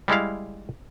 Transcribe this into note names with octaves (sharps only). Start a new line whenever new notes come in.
G3 G#3 E4 F5